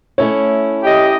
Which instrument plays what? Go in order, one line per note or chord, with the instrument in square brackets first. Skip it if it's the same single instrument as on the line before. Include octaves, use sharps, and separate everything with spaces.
[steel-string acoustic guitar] A3 C#4 E4 [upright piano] C#5
[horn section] G4 D#5